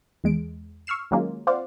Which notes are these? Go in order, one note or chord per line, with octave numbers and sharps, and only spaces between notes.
E2 G#3 D7
C#6 E6 F6 C7 E7
D#3 F#3 G#3 A#3 C#4 F4
C4 F4 C5 D5 F5 F#5